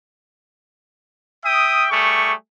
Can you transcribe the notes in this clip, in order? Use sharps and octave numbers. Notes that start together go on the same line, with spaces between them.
E5 G5 D#6
G3 A3 G#4 C#6